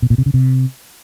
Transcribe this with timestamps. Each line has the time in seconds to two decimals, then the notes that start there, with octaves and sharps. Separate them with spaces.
0.02 B2
0.10 A#2
0.18 C3
0.26 C#3
0.34 C3